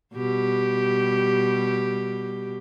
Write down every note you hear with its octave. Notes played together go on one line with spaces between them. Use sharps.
B2 G3 G4